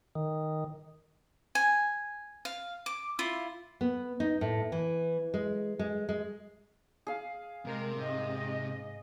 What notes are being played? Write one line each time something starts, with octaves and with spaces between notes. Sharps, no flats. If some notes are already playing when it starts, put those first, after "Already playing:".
D#3
G#5
F5
D6
E4 F4
B3
D#4
A2
E3
G#3
G#3
G#3
G#4 F5
C3 G#3 A#4
G#2 D#5